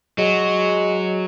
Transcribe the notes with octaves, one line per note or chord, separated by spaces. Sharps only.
F#3 G#3